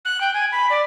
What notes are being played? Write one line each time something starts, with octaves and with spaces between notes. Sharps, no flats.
F#6
G5
G#5
B5
D5